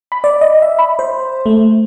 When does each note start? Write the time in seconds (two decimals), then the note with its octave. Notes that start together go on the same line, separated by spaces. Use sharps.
0.12 B5
0.24 D5
0.41 D#5
0.62 E5
0.79 B5
0.99 C5
1.46 A3